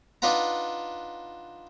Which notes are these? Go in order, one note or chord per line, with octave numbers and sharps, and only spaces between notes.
D4 D#4 F4 B4 F#5 A#5